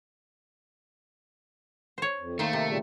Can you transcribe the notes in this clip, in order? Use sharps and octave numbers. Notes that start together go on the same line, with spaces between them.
C5 C#5
F2
D#3 A3 A#3 C5
C3
A#2 C#3 G3